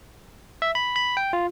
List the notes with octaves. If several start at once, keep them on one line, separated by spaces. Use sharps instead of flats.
E5
B5
B5
G5
F4